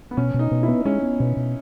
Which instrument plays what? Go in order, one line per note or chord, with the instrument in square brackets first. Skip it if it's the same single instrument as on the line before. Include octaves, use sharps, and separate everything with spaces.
[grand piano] B3
[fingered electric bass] B2 [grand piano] C#4
[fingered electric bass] B2
[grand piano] D#4
[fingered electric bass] B2
[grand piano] E4
[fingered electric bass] B3
[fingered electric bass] G#3 [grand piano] C#4
[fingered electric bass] B3
B2
B2